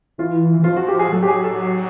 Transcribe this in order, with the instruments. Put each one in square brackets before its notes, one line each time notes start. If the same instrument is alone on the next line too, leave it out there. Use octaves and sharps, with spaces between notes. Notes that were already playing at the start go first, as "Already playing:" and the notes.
[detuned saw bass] E3 [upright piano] F4
[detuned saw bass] E3
[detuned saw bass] F3 [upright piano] F4
[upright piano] F#4
G4
G#4
[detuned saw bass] F#3 [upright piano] A4
[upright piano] G4
G#4
A4